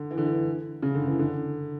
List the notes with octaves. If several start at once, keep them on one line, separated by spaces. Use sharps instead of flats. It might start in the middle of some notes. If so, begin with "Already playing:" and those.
Already playing: D3
E3
D3
E3
C#3
D3
E3
D3